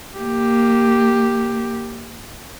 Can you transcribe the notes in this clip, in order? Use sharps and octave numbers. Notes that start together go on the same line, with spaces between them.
A#3 G4